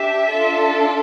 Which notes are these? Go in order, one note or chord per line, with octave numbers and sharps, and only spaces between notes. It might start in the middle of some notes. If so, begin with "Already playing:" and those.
Already playing: D4 G4 E5
D4 F4 A4